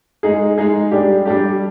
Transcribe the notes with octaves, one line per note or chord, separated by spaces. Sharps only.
G#3 D#4 G#4
G#3 D#4 G#4
G3 D4 G4
G3 D4 G4